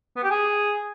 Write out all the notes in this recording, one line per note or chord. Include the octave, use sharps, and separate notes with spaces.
B3
G4
G#4